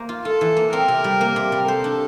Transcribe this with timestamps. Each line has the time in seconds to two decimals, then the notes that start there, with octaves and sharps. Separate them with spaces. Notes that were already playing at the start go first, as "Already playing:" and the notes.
Already playing: A#3 C5
0.09 F4
0.25 F4 A4
0.41 E3
0.57 A#3
0.72 C4 A#4
0.88 C3
1.04 G3
1.21 A#3
1.36 C3
1.52 G3
1.68 A4 C5
1.84 D4